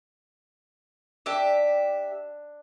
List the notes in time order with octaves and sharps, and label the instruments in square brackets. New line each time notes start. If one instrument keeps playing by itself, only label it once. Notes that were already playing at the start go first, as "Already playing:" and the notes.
[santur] D4 [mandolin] G4 E5